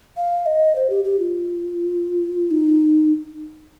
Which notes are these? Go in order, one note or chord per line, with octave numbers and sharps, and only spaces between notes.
F5
D#5
C5
G4
G4
F4
D#4